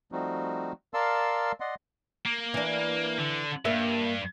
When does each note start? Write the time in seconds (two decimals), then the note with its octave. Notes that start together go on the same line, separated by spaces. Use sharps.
0.12 F3 G3 A3 C4 D#4 F#4
0.94 A#4 D5 F5 A5 C6 E6
1.60 D5 D#5 F#5 C6
2.26 A#3
2.54 E3 D4
3.19 D3
3.65 G2 A#3 E5